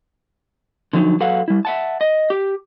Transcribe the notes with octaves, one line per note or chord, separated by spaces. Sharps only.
D3 F3 F#3 A#3 D#4
F#3 A4 B4 F5 F#5
G3 E4
E5 F#5 A5
D#5
G4